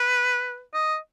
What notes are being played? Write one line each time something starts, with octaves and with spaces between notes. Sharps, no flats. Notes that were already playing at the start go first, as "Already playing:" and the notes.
Already playing: B4
D#5